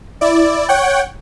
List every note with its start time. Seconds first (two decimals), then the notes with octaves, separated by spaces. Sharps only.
0.21 E4 D5
0.69 C#5 F#5 G5